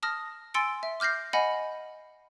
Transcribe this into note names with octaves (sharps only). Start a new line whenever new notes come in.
A5 D#6 F6 A#6
G#5 C6 E6 A6 C#7 D7
E5
D6 F6 G6 A#6 C7
D#5 F#5 G#5 B5 A#6